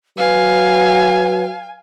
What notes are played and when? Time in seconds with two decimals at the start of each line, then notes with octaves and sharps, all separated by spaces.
0.18 F#3 B4 F5 G#5